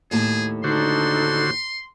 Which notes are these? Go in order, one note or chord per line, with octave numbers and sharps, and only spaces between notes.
D#2 A2 G#4 A5
D3 D4 D#4 F#4 A4 C5 C6